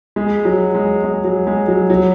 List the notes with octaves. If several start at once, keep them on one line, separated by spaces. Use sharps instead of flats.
G#3
F#3
G#3
G#3
F#3
G#3
F#3
F#3